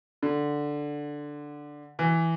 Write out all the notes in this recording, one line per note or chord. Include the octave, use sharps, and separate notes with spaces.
D3
E3